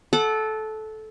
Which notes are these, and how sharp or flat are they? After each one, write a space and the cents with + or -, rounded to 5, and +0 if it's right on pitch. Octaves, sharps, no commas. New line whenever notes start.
A4 -15 F#5 +0 D6 +45